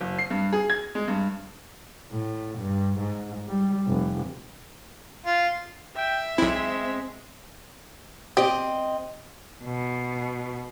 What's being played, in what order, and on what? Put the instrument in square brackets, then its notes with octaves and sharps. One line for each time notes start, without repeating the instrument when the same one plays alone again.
[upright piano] F#1
C7
G2
G#4
G#6
G#3
G2
[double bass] A2
G2
G#2
G3
F1
[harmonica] F4
[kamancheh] E5 [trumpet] G5
[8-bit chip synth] B1 E4 [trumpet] G#3 [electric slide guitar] C4
[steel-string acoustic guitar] C4 D#5 [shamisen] G4
[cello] B2